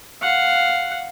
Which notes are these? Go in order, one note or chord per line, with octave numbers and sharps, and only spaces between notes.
F5 F#5